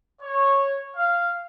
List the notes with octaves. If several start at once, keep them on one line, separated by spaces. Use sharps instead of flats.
C#5
F5